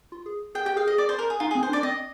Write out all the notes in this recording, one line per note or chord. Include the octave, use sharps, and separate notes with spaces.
F4
G#4
G#4 G5
G4 G5
G#4 F5
G#4 D#5
D5
C5
A#4
G#4
D#4 F4
G#4
C4
C5
D4
D5
C4 D#5